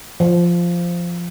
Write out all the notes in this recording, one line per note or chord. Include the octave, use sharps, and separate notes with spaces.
F3